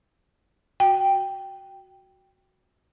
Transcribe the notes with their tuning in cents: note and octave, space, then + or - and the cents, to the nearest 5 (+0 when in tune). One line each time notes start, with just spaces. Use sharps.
F#4 +0 G5 +0